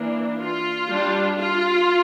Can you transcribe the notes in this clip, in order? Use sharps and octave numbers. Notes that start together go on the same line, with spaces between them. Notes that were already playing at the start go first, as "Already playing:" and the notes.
Already playing: E3 A#3 D4
F4
G3 D4
F4